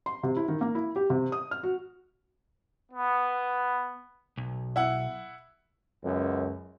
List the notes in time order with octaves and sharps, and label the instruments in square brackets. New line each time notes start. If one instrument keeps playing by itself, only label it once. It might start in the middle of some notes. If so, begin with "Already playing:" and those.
[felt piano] C6
C3
E4
D#3
A#3
E4
G4
C3
D#6
F6
F#4
[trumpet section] B3
[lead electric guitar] B1
[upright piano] E4 F#5
[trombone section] C#2 F#2